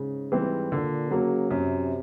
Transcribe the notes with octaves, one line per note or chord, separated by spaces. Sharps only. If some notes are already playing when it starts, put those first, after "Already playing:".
Already playing: G#2 C#3
G#2 E3 G3 C4
A#2 D3
C#3 F#3 A#3
F#2 C3